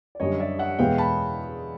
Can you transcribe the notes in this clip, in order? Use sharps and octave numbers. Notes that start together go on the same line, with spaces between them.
D5
F#2 D3 G3 C#5 D#5
D5 E5
E5 F#5
E2 B2 G#3 B3 F5 G5
A5 B5